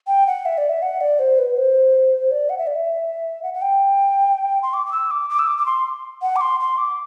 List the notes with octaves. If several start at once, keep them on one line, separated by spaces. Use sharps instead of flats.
G5
F#5
E5
D5
E5
F#5
D5
C5
B4
C5
D5
F#5
E5
D5
E5
F#5
F#5
G5
C6
D6
D6
E6
D6
D6
E6
D6
D6
C6
F#5
D6
C6
C6
D6